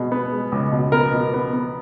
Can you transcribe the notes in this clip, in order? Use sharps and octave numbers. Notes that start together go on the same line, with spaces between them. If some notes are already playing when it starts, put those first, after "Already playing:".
Already playing: B2 G#3
B3
G#3
C#2
B2
B3 A#4
B2
B3
B3